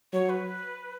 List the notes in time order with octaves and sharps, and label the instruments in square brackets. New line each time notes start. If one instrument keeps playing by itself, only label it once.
[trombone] F#3 [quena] C#5
[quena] B4